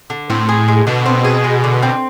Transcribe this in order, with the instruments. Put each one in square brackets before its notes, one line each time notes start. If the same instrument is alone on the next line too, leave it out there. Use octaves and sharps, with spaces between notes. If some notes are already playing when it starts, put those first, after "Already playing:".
[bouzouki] D3
[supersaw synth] A2 [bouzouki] C4
[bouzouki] G#4
G#3
[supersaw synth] B2 [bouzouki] D3
[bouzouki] C4
G#4
G#3
D3
C4